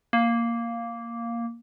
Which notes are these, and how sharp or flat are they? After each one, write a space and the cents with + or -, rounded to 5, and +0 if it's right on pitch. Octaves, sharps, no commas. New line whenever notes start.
A#3 +0